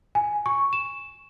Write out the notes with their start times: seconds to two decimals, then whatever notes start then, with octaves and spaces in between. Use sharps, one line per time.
0.15 G#5
0.46 C#6
0.73 E7